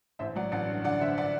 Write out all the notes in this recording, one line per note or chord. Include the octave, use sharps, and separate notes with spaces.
A1 C5 E5
F#3 D5 F#5
A1 D5 F#5
G2
D3 D5 F#5
D3 C5 E5
D5 F#5